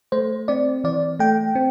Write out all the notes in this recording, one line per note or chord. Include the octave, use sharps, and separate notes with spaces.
A3 C5
C4 D5
E3 D5
A3 G5
C4